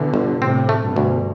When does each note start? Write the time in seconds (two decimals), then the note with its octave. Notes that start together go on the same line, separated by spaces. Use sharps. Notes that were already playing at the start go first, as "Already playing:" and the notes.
Already playing: B2 D3 E3
0.14 G1
0.41 A2 C3 C4
0.69 A3
0.83 G2 B2
0.96 D2